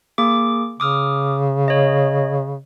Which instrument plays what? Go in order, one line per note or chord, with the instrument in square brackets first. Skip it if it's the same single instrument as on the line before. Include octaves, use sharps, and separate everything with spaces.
[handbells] A#3 G#4 D6
[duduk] C#3 [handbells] D6 D#6 F6
[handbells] C#5 D#5